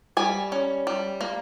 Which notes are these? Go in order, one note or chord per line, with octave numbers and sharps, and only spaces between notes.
G3 G#5
C#4
G3
A#3